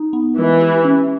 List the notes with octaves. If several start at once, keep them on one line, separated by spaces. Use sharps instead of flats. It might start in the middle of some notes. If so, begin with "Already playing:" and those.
Already playing: D#4
B3
E3 G#3
G4
C#4